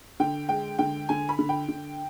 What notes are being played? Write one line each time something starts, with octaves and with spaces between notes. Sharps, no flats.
D3 G5
G#3 G5
D3 G5
D3 G#5
B5
D3
G5
D3